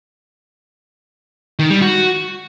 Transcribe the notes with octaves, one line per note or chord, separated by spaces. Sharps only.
D#3
G3
F#4